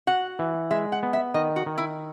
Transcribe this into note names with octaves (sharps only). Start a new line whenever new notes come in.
F#4 F#5
E3
G#3 E5
F#5
B3
E5
D#3 D#5
F#4
D#3
E4